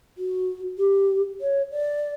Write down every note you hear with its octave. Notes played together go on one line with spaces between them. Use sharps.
F#4
G4
C#5
D5